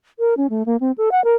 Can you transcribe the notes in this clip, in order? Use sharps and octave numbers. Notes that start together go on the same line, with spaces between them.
A#4
C#4
A3
A#3
C4
A4
F#5
A#4